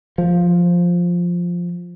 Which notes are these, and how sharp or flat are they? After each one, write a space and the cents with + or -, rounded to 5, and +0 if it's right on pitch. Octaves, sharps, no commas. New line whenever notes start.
F3 +5